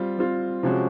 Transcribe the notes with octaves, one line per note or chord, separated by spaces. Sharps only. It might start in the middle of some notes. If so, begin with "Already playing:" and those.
Already playing: G3 C4 F4
G3 C4 F4
C3 F3 G#3 C#4 F#4